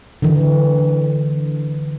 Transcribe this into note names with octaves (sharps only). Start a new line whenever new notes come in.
D3 E3